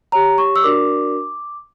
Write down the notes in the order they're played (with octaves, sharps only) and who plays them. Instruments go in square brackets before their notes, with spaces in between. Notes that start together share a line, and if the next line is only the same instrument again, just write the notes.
[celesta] G4 C#5 A#5
C#6
E6
D4 F#4 A#4 D5 D6